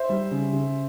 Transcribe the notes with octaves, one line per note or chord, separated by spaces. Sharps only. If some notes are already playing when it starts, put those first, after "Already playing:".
Already playing: C5 E5
G3
C#3
C#3